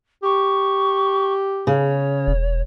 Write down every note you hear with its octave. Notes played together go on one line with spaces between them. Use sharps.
G4 C#6
C#3 C#5
E1